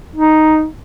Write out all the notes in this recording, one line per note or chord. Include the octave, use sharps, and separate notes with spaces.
D#4